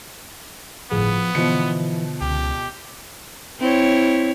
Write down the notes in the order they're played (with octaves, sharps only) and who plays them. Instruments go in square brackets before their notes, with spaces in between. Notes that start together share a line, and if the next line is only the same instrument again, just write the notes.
[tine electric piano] G1 A2 G#4 [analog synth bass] F3 [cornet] B3
[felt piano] B2 F3 C#7 [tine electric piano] D3 [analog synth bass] E3
[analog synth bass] C#2 [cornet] G4
[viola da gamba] C4 E4 C#5